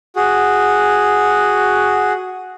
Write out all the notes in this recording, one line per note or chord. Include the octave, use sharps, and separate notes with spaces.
F#4 G#4